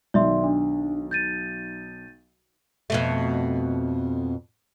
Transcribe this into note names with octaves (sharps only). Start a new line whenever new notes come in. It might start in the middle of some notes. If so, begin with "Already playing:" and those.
B1 D#3 D5 E5 C6
D4
G6 A6 D#7
F2 B2 A3